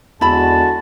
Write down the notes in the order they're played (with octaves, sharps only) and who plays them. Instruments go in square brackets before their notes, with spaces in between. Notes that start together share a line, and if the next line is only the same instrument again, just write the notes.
[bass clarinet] E2 [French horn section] D3 G#3 F#4 [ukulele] E4 B5 [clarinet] A5